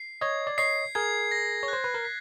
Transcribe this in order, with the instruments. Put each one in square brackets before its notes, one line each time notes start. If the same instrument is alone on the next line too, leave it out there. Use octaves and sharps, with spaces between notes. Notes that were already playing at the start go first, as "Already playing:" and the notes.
Already playing: [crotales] C7
[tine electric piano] C#5 D#5 [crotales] G#6
[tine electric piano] D5
[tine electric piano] C#5 D#5 [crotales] C7
[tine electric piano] G#4 A#4 [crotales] G#6
[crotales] A#6
[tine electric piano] C#5
[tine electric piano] C5 [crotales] F#6
[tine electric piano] B4
A#4
[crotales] B6